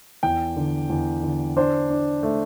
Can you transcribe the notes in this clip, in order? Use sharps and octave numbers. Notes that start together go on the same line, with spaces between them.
E2 G5
D3
E2
D3
D4 C5
D4
A3